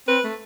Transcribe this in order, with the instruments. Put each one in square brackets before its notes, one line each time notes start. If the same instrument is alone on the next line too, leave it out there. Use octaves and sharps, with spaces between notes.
[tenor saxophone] C4 [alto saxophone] B4
[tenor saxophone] A3